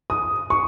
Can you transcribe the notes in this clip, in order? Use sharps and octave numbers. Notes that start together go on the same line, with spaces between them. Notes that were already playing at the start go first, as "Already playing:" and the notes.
D#6
C#6